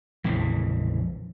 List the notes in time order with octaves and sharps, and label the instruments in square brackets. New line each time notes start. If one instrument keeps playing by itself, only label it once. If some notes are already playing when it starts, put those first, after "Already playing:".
[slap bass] A#1 F2 C#3 E3